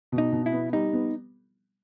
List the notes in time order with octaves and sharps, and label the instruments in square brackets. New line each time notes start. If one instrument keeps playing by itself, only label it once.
[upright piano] B2
[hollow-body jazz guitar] D#4
[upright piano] B2
[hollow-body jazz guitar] E4
[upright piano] B3
[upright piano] G3 [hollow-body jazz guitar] D#4
[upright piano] B3